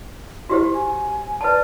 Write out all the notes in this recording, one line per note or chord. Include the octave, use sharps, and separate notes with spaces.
E4 F#4 G4 C5
G#5
B4 D5 A5